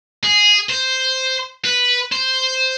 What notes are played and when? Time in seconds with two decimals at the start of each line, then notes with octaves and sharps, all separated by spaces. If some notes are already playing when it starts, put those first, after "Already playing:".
0.23 G#4
0.70 C5
1.65 B4
2.12 C5